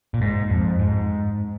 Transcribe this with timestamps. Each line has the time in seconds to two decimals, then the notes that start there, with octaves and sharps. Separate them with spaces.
0.14 A#2
0.21 G#2
0.50 F2
0.79 G#2